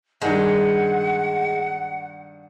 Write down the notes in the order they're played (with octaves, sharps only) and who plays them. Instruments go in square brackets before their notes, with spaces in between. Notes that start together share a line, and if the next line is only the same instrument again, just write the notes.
[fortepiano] G2 D#3 D4 [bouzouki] G#3 [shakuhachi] F#5